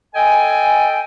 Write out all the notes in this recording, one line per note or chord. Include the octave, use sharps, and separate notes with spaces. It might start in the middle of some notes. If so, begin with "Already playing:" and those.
A4 D#5 G5 G#5